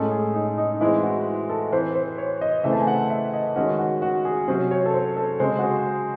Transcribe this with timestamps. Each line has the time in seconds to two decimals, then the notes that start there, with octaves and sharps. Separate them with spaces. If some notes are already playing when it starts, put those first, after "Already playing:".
Already playing: A2 G#3 C#4 A4
0.11 G#4
0.34 D#4
0.58 D#4
0.73 D#4
0.81 E3 G#3 C4 E4
1.03 F#4
1.49 A4
1.72 E3 C4 C5
1.95 C5
2.18 C#5
2.41 D#5
2.64 C#3 E3 A3 C4 E5
2.73 A5
2.80 G#5
2.87 F#5
3.10 E5
3.33 D#5
3.56 D#3 G#3 C#4 F#4
3.79 F#4
4.02 F#4
4.25 G#4
4.48 C3 F#3 C#4 C5
4.71 C#5
4.86 A4
4.94 C5
5.17 A4
5.40 C#3 G#3 C4 C5
5.59 F#4
5.63 G#4